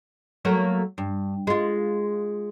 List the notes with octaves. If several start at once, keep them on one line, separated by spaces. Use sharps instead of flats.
F#3 A3 A#3
G2
G#3 F4